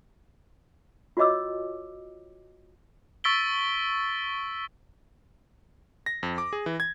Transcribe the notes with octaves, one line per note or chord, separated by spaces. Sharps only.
F4 F#4 C#5 D#5 D6 E6
C#6 E6 A6 B6 D7 G7
A#6
F2
D6
G#4
E3
G#6